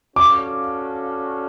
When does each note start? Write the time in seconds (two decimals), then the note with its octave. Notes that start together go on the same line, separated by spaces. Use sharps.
0.16 C#4 F#4 A4 D5 F5 D6